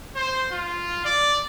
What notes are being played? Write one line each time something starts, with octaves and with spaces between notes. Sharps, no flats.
C5
F4
D5